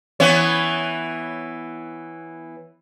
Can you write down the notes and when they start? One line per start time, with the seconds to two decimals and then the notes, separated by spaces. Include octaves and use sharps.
0.20 E3 B3 C#5